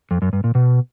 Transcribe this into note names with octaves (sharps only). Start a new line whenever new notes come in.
F2
F#2
G2
A#2
B2